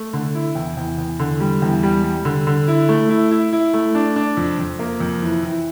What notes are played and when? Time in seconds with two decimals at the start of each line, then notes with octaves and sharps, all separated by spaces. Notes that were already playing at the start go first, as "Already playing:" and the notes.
Already playing: A3
0.13 D3
0.35 E4
0.55 E2
0.77 E2
0.98 E2
1.19 D3
1.40 G3
1.62 E2
1.83 G3
2.04 G3
2.25 D3
2.47 D3
2.68 E4
2.89 A3
3.10 E4
3.31 E4
3.53 E4
3.73 A3
3.95 D4
4.16 D4
4.37 F2
4.59 F2
4.79 A#3
5.00 F2
5.22 E3
5.43 E3